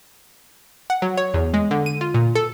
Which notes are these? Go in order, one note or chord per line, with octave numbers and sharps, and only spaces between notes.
F#5
F#3
C#5
E2
G#3
D3
D#7
F4
A#2
A4